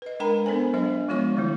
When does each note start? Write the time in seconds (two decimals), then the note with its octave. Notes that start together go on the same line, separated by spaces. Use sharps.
0.02 B4 D#5
0.20 G#3 D4 A#4 G5 A#5 B5
0.46 B3 D4 A4 C5 G#5
0.74 F#3 B3 D4 C5 D#5
1.08 F3 G#3 B3 F4 C#5 C#6
1.37 D#3 F#3 A3 E4